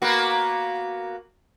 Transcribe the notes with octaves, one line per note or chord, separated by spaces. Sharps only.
A#3 B3 F#4